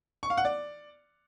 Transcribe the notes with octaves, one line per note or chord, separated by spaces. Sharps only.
C#6
F5
F#5
D5